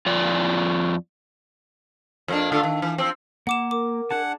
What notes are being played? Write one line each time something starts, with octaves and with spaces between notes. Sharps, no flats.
F2 F4 D5
F2 A#3 D4
D3 A3 F4
D#3
E3
F3 C4
A#3 F#5 D6 E7
A#4 D6
D4 G#4 F#5 A5